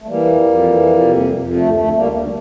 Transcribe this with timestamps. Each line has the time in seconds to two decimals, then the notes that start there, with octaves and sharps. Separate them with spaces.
0.02 A3
0.06 E3 G3 A#3
0.25 F2
0.44 F2
0.63 E3
0.82 F2
1.00 C3
1.20 F2
1.38 F2
1.57 D2 A3
1.75 D2 A3
1.95 D2 G3 A#3
2.13 D2